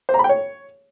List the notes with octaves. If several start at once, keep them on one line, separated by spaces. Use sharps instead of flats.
C5
A#5
B5
G5
C#5